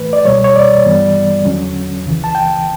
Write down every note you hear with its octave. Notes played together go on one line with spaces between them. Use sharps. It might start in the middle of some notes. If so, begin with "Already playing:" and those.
Already playing: A2 E3 A3 B4
D5
C#2 B2 G3 C#5
C#5
D5
G2 E3 G3 B3
E2 D3 F#3 C#4
C#2 C#3 E3
A5
G5